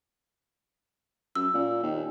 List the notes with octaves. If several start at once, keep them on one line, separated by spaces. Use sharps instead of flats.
F#2 E6
A#2
D#2